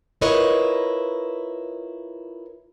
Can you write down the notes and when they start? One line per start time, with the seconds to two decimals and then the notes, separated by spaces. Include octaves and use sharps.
0.21 E4 F4 A#4 B4 C#5 D#5